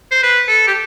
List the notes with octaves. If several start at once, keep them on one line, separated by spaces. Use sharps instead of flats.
C5
B4
A4
G4